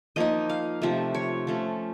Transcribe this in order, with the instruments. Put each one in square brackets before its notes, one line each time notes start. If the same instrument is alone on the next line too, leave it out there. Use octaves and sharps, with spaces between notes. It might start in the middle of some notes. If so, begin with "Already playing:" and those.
[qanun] F3 A#3 D#4 D#5
F5
C3 F3 A3
C#5
F3 A3 C#4